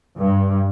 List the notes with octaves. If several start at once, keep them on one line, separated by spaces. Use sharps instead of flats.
G2